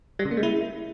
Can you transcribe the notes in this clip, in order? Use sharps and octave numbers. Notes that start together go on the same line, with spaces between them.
G3
C#3
A#3
G#3
E4